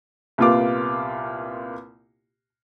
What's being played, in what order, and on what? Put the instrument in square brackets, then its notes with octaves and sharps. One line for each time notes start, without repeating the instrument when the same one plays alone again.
[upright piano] C2 A#2 B3 F4 F5 D6